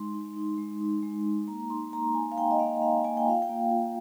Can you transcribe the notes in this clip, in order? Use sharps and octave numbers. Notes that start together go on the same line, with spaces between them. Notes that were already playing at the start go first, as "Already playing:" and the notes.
Already playing: G#3 D#4 C6
D#4
D#4
G#3
D#4
G#3
D#4
A#3 A#5
D#4 C6
A#3 A#5
D#4 G#5
F5
A#3 G5
D#5
A#3 F5
A#3 F5
A#3 G#5
G5
F4 F5
G5
A#3
F4